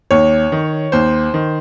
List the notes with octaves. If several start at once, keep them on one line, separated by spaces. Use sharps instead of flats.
D#2 C#5
D#3
D#2 C5
D#3